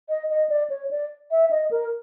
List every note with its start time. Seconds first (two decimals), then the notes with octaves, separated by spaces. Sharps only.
0.09 D#5
0.30 D#5
0.49 D5
0.70 C#5
0.91 D5
1.31 E5
1.51 D#5
1.71 A#4